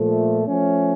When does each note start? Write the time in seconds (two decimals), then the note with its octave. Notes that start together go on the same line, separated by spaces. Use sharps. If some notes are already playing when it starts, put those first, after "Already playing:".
Already playing: A#2 F3 A3
0.47 F3 A3 C#4